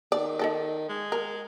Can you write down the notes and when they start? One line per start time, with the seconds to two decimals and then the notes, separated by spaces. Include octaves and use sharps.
0.12 D#3 D5
0.39 D#4 A4 D5
0.89 G#3
1.12 A#4